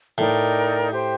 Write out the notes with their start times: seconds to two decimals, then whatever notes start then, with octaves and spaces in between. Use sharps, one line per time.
0.18 A2 D#4 A#4 D5 G5
0.91 G4 C5 G5